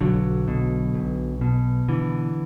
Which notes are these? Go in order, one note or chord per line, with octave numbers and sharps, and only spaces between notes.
B1 D3 F#3
B2
B1
B2
D3 E3